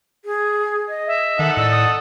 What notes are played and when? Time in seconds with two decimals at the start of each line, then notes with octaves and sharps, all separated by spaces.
0.25 G#4
0.89 D#5
1.07 E5
1.39 D#3 D#4 A4 F#5
1.57 A2 D5 E6
1.71 D#6